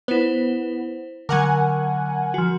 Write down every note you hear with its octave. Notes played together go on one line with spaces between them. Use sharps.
B3 E4 C5
D3 F#3 A#4 F#5 G#5
F3 F#4